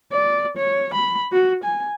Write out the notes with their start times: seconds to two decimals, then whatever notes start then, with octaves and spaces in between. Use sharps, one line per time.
0.12 D5
0.57 C#5
0.94 B5
1.32 F#4
1.64 G#5